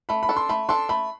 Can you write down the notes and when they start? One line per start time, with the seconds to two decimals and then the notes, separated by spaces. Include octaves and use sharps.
0.09 A3 B5
0.23 B5
0.29 D4 A4
0.36 C6
0.49 A3 B5
0.69 D4 A4 C6
0.89 A3 B5